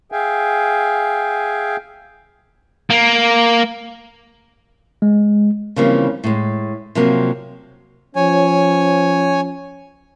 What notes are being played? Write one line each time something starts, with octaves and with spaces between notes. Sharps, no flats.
G#4 E5 F5 G5 G#5
A#3
G#3
C#3 E3 F3 G3 A#3 C4
A2 G#3
C3 F3 F#3 A#3 C4
F3 C#4 C#5 G#5